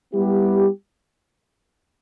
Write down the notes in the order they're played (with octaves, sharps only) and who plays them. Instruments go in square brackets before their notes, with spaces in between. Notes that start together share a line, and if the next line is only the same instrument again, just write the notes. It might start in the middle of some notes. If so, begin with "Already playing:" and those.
[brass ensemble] G3 B3 E4 G4